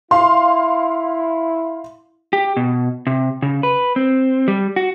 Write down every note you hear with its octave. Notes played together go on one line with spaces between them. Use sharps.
E4 F5 C6
G4
B2
C3
C#3
B4
C4
G3
F#4